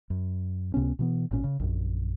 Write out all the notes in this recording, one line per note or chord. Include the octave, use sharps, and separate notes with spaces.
F#2
C#2 C3 B3 C#4
B2 E3 B3
G#1 A#2 C#4
C#3
A#1 F#2